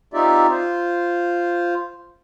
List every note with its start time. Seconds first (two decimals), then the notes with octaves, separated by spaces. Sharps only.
0.14 C4 D#4 F4 G4 D5 E5
0.51 F4 C5